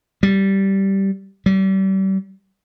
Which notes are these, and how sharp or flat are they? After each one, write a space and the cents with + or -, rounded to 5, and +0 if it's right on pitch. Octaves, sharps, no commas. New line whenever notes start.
G3 -10
G3 -35